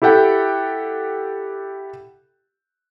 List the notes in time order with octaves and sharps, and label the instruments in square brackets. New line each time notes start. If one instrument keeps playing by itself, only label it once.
[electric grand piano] E4 G4 A4 F#5 G5